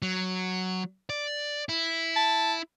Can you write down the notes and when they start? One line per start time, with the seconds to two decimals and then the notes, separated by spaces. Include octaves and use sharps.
0.02 F#3
1.10 D5
1.69 E4
2.16 A5